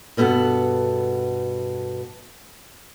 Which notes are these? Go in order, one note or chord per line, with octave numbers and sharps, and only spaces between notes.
G2 B2 B3 A4 F#5